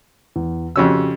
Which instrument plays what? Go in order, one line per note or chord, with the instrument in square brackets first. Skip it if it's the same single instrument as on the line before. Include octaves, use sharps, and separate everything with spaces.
[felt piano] E2
[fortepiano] F2 C#4 E6 [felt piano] C#3 F#4 G4